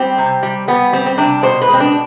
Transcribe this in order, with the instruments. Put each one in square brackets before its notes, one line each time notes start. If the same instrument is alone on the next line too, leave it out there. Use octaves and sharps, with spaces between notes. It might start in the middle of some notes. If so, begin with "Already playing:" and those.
Already playing: [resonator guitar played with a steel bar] G3 C4
C3
G3
G3 B3
G3 C4
C4
C3 D4
B2 C5
B4
G#3
C4
D4